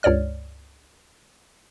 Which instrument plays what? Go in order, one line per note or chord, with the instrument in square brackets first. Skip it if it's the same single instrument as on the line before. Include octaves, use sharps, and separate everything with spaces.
[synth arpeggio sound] C#2 G2 C#5 D5 F6